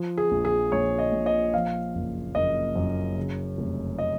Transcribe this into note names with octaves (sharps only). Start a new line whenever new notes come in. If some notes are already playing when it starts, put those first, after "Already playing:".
Already playing: F3
G#4
A#1
G#4
A#1 C#5
D#5
A#2
D#5
F3 F5
F#1
F#1 D#5
F#2
C#3
F1
D#5